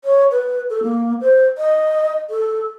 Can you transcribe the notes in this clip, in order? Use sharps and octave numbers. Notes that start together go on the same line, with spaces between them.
C#5
B4
A4
A#3
C5
D#5
A4